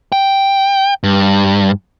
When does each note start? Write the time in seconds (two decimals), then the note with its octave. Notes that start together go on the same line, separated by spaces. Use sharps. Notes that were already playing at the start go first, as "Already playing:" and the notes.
0.12 G5
1.03 G2